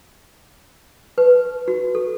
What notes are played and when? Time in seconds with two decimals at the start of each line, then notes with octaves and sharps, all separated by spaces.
1.18 B4
1.68 F#4
1.95 A4